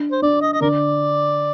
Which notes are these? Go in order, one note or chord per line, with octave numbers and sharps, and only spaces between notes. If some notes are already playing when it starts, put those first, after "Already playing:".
Already playing: D4
C5
D4 D5
D#5
D#5
D3 A#4 D5